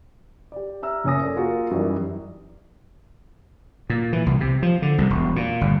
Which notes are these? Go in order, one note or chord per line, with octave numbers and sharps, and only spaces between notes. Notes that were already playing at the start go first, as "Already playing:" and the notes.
G4 D5
E5 A#5 E6 F6
F#1 C#4 C#5 G#5 D#6 A#6
A4 D5
A#3 F4 F#4 G#4 A#4
F#2 E3 G3 D#4
A#2
E3
C2
C3
F3
D3
C2
E1
A#2
G1